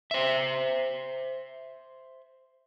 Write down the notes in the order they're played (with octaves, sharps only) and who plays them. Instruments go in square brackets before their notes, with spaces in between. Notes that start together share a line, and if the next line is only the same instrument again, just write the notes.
[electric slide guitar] C5 E5